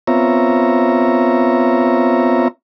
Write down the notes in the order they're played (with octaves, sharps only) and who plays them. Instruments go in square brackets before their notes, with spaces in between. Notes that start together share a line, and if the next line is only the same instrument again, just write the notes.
[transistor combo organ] B3 C4 F4 C#5 E5 A#5